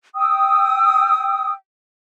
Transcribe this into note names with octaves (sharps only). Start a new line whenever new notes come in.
G5 D#6 E6